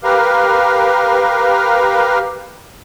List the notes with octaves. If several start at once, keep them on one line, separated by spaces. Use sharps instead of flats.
G4 A#4 B4 F5